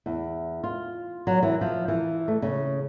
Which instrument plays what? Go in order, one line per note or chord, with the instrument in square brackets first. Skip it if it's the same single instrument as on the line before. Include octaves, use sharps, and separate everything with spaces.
[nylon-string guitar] E2
F4
F#3
E3
F3
E3
A3
C#3